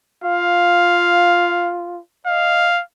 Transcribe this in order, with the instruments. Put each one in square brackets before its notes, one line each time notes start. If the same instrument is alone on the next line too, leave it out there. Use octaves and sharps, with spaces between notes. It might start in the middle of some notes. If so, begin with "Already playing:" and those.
[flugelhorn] F4 [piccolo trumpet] F5
[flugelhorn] D#5 [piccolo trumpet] F5